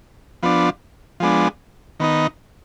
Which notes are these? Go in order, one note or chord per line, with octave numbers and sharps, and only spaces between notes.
F3 B3 D4
F3 G#3 B3 D4
D#3 B3 D#4